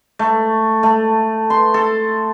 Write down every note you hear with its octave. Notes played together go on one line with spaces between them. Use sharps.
A3
A3
C6
A4